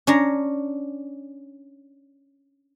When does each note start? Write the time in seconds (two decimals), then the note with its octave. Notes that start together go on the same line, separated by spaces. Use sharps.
0.07 C#4 D4 A#5